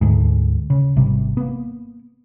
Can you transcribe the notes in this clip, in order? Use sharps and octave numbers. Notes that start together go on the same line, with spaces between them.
D2 G#2
C#3
G#1 C3 G3
A#3 B3